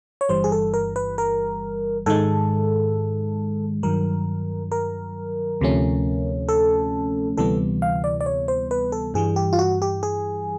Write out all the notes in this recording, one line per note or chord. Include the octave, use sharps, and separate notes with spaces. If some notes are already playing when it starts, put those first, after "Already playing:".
C#5
G1 G2 E3 G3 C5
G#4
A4
A#4
B4
A#4
G#2 D#3 G#3 A4
G2 D#3 F#3 A#4
A#4
D2 C3 F3 A3 C#4
A4
D2 C3 E3 G3 B3 A4
F5
D5
D5
C#5
C5
B4
A4
G2 E3 G3 G#4
G4
F4
F#4
G4
G#4